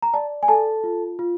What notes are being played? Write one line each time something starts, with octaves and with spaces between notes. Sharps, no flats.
A#5
D5 A5
G#5
A4 A5
F4
F4